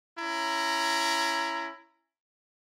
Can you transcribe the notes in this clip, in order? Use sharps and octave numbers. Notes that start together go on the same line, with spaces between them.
C#4 E4 A#5